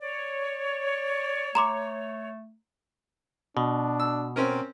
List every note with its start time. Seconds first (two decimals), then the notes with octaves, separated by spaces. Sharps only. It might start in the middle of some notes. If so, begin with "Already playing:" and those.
0.02 C#5 D5
1.55 A3 A#5 C6 D6
3.57 B2 D4
4.00 E6
4.36 C4 C#4 A#4